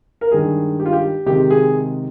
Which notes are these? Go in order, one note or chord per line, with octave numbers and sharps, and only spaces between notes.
A#4
G2 D#3 G#3 G#4
G4
F4
G4
C3 D#3 G#3 G4
G#4